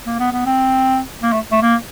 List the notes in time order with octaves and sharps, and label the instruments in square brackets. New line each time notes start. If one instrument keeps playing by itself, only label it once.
[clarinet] A#3
B3
B3
C4
A#3
A3
A3
A#3